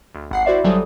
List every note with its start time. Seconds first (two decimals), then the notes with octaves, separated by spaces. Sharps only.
0.15 D2
0.31 G#1 F#5 C7
0.46 E4 F#4 C5 D5 E5
0.64 G1 F#3 G3 A4 D#6